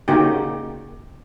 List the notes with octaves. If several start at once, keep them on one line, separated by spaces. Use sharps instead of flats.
C#3 A#3 D#4 F#4 G4